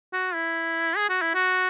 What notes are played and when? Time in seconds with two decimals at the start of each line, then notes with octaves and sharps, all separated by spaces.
0.13 F#4
0.34 E4
0.97 G#4
1.09 F#4
1.22 E4
1.35 F#4